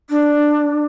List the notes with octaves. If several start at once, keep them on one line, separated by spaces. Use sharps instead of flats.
D4